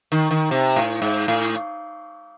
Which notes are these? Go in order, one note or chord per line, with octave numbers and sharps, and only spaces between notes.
D#3
D#3
C3
A2
G#2
A2